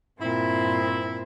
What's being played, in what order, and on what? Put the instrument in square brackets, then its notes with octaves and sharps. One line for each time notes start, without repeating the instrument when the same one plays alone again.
[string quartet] G2 A#2 C4 [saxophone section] E4